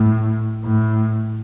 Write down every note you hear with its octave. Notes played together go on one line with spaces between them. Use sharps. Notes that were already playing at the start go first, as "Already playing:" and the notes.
Already playing: A2
A2